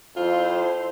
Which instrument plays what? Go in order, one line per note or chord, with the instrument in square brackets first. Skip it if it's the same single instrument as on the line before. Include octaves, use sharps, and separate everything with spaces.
[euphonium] F2 [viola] E4 C5 [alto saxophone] F4